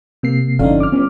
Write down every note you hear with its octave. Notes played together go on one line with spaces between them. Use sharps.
C3 A#3 C7
G1 F2 D3 C#4 D#4 F5
D6 F6
G1 C#4